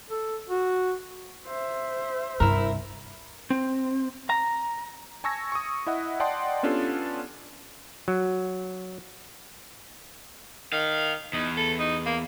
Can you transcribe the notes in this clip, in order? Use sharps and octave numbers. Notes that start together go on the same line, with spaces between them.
A4
F#4
C5 E5
C2 G2 E4 A#4
C4
A#5
G#5 A5 C#6 E6 G#6 A#6
C#6 D#6
E4 D#5 E5 F#5
D5 D#5 F#5 G5 A5 C6
B3 C#4 D4 F4 G4 A4
F#3
D#3 F5
E2 D#4
A4
D#4
A#3